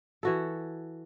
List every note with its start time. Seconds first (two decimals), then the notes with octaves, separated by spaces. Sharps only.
0.23 E3 F#4 A4